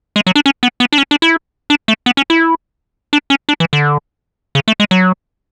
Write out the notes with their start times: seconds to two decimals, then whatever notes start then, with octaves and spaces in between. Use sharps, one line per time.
0.16 G#3
0.27 F#3
0.35 D4
0.46 C#4
0.63 B3
0.80 B3
0.92 D4
0.98 C#4
1.11 D4
1.22 E4
1.70 D4
1.88 A3
2.06 B3
2.17 C#4
2.30 E4
3.13 D4
3.30 C#4
3.49 D4
3.60 E3
3.73 D3
4.55 C#3
4.68 A3
4.80 G#3
4.91 F#3